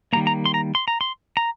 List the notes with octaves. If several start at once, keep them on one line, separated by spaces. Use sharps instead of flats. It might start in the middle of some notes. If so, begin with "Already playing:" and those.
D#3 G3 A#3 A#5
A#5
C6
A#5
C6
A#5
C6
A#5